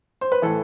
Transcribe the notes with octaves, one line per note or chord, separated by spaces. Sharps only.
C5
B4
A2 E3 A4